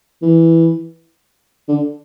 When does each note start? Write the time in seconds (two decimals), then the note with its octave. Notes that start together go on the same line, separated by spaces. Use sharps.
0.22 E3
1.68 D3